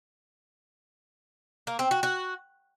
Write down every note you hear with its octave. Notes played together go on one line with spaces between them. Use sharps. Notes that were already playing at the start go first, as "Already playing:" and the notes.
A#3
C4
F#4
F#4